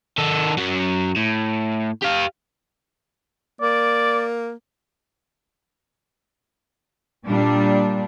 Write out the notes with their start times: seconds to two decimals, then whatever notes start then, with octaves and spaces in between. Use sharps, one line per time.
0.18 D#3 A4
0.58 F#2 F#3
1.16 A2
2.03 G4 F5
3.61 A#3 D5
7.27 A#2 G3 D4